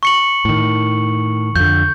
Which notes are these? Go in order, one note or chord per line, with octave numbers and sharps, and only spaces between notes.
C#6 C#7 F#7
A2 D#3
F2 D3 G6